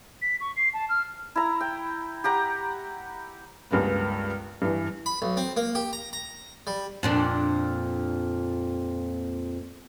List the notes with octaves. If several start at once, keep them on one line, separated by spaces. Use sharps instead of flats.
B6
C#6
C7
A5
F6
E4 A#5
G5
G4 F#5 A#5
C#2 G2 G#3 A#3 B3
G2 E3
B5
B1
C4
A#3
G4
A#5
A#5
G3
F2 A#2 D4